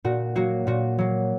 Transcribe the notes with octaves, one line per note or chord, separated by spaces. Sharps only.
A#2 F#4
F#3 A#3 F#4
A#2 F#4
F#3 A#3